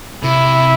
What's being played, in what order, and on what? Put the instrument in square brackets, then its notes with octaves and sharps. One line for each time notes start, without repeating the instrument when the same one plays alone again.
[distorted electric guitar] C3 [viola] E4